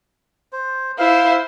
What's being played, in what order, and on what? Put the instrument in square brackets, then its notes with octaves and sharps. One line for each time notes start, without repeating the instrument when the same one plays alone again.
[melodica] C5
[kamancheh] E4 C5 [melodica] F5